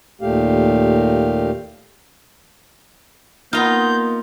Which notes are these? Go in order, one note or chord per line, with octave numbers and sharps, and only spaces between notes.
D#2 A#2 A3 G4 F5
A#3 B3 D#4 F4 A#5 G6